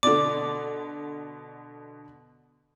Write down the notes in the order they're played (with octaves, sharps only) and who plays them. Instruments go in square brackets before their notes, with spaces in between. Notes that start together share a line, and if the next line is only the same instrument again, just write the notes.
[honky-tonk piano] B2 D3 [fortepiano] D5 [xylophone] D6